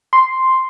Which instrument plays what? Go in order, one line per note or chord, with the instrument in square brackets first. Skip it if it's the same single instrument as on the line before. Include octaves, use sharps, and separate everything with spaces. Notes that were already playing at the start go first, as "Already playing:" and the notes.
[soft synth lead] C6